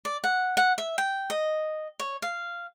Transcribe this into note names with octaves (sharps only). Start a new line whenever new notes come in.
D5
F#5
F#5
E5
G5
D#5
C#5
F5